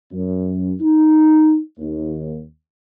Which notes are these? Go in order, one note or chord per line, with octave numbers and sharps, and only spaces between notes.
F#2
D#4
D#2